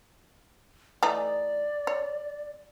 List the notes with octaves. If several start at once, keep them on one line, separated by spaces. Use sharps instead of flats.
E3 A3 D#4 D5
C#5